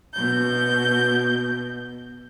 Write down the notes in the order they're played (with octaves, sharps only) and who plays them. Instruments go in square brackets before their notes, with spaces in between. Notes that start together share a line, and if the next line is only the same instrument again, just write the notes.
[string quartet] B2 G6